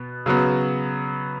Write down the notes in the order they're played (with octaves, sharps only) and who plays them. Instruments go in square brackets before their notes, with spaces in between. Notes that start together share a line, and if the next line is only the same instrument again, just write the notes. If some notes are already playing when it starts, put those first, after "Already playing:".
Already playing: [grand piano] B2 B3
C#3 F#3 B3 F#4